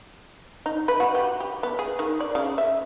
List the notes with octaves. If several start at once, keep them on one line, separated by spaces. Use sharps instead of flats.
D#4
B4
F#4
G4
G4
B3
G#4
D#3
D5
C#3
E5